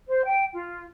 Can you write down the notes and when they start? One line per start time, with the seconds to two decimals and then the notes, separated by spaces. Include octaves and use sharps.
0.08 C5
0.24 G5
0.54 F4